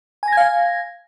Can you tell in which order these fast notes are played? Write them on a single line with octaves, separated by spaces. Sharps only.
G#5 A#6 G#6 F5